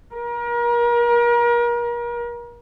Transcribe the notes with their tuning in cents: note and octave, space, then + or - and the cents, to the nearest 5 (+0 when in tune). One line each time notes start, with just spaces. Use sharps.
A#4 +35